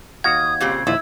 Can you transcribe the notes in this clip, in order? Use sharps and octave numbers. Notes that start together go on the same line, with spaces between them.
D#2 F#4 F5 D#6 G#6
A#2 C#3 C4 G4
A#1 D#2 E4 F4 E6